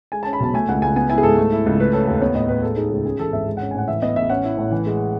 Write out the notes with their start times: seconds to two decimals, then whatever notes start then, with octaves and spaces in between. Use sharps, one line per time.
0.12 G#3 G#5
0.23 A5
0.26 C#4
0.33 B5
0.40 B1 A5
0.54 A3 G#5
0.68 C#2 F#5
0.81 C#2 G#5
0.96 B3 G#5
1.10 E4 G#5
1.18 G#4
1.23 G#2 A4
1.38 A3
1.52 E4
1.66 C#2
1.79 A3 B4
1.93 C#4 A4
2.07 D#2 A4
2.22 B3 C#5
2.35 A2 D#5
2.49 A2 B4
2.62 G#3 A4
2.76 D#4 G#4
2.90 C#2 G#4
3.05 C#3 G#4
3.19 E3 A4
3.32 G#1 E5
3.47 G#3
3.57 F#5
3.61 C#4
3.71 G#5
3.75 A2 F#5
3.88 E3 E5
4.02 B3 D#5
4.16 A1 E5
4.30 C#4 F#5
4.44 E4
4.58 A2
4.71 E3
4.86 G#3